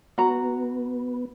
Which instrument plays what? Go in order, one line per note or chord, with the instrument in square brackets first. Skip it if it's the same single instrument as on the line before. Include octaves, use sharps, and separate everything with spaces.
[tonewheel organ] B3 [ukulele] F#4 A#5